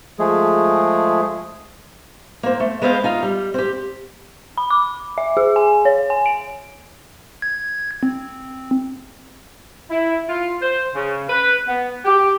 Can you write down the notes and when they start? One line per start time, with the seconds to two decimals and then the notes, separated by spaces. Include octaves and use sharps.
0.19 F3 G#3 A3 G#4
2.43 A#3 C4
2.60 A3
2.82 G#3 B3 C4 C5 D#5 F5
3.04 D#4 F4 F5
3.23 G3
3.54 C4 G4
4.58 B5
4.70 D6
5.18 E5
5.37 G#4
5.56 G#5
5.85 C#5
6.10 G#5
6.26 D7
7.42 G#6
8.03 C4
9.90 E4
10.29 F4
10.62 C5
10.95 C#3
11.29 B4
11.68 B3
12.05 G4